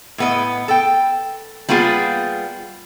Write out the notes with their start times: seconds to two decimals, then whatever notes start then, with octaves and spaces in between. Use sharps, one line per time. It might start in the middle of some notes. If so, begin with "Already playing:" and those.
0.18 A2 B3 D#5
0.68 A4 G5
1.69 G3 A#3 B3 F4 G#4